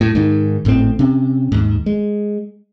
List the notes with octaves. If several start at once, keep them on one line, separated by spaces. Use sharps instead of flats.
A2
G#2 D#3
G#1 A2 A3 C4
C3 C4 C#4
D#2 G#2
G#3